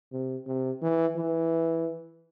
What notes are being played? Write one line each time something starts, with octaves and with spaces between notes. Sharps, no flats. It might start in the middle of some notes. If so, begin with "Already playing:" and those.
C3
C3
E3
E3